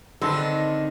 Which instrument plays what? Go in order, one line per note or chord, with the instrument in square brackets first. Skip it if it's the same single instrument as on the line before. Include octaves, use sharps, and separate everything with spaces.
[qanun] D3 [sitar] D#3 D4 D#4 [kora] C4 A4 B4